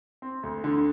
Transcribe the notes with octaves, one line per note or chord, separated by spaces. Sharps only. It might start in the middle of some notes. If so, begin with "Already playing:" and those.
C4
D2
D3